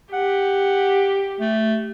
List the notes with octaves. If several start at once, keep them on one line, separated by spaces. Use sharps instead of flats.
G4 F#5
A3